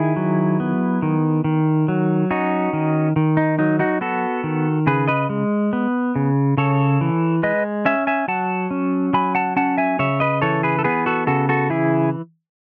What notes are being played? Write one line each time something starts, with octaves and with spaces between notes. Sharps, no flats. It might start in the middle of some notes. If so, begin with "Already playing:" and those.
Already playing: D#3 E4 G#4
F#3
B3
D#3
D#3
F#3
C#4 D#4 F#4
D#3
D#3
D#4
F#3 D#4
D#4 F#4
B3 F#4 A4
D#3
C#3 G#4 B4
B4 D#5
G#3
B3
C#3
C#3 A4 C#5
E3
G#3 B4 D#5
C#4 E5 G#5
E5 G#5
F#3 F#5 A5
C#4
F#3 G#5 B5
F#5 A5
C#4 F#5 A5
E5 G#5
C#3 C#5 E5
B4 D#5
E3 A4 C#5
G#4 B4
A4
B3 G#4 B4
F#4 A4
C#3 F#4 A4
F#4 A4
E3 E4 G#4